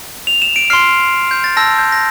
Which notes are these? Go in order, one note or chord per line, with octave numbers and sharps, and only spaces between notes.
F7
E7
D7
C6 F6 C7
G6
A6
A5 E6 G6 A#6
G6
A#6